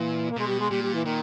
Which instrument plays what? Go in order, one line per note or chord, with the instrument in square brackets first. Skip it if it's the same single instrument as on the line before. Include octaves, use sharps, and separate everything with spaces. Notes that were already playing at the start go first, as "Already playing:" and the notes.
Already playing: [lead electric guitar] A#2 [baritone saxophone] E3
[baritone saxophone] A#3
[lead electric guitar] B2 [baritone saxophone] G#3
[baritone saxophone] G3
G#3
[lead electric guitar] A#2 [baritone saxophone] G3
[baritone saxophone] G3
E3
[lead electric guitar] A#2 [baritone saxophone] D#3